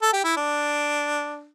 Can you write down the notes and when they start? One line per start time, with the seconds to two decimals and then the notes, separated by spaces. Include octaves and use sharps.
0.02 A4
0.13 G4
0.24 E4
0.37 D4